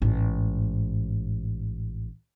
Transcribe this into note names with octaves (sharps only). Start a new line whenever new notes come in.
A1 G#2